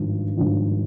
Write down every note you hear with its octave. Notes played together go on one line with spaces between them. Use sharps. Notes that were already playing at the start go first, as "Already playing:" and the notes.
Already playing: G#1 G2 F3
G#1 G2 F3